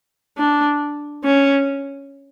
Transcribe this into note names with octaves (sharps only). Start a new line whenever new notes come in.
D4
C#4